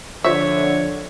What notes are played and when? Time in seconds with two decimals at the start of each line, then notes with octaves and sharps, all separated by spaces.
0.24 D3 F3 F4 C5 C#5 E5 C#6